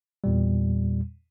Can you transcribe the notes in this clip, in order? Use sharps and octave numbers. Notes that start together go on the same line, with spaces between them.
E2 A#2 G3